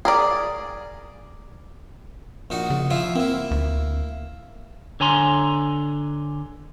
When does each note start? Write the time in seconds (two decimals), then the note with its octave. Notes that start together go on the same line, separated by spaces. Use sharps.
0.05 G#4 A#4 D5
2.50 A#1 D#4 F#4
2.70 C#3
2.91 F3 E4 F4
3.15 A#3 C4 E4
3.51 D2
5.00 D3 C#5 G#5 A#5 C6